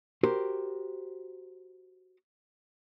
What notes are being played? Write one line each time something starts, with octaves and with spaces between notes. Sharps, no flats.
F#4 G4 A#4 C5